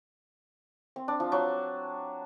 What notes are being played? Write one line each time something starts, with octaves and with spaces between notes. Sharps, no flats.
C4
D4
F3
F#3